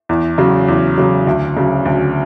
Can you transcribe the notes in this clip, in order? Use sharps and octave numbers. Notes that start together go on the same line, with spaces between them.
E2
C#3 F#3
E2
C#3 F#3
D2
C#3 F#3
D2